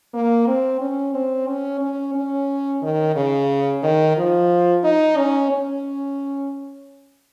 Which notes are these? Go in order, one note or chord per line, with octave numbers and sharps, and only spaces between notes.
A#3
C4
C#4
C4
C#4
C#4
C#4
D#3
C#3
D#3
F3
D#4
C#4
C#4